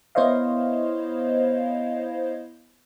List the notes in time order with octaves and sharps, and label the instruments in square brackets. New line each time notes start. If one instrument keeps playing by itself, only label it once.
[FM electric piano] B3 E4 C5 C#5 D#5 F5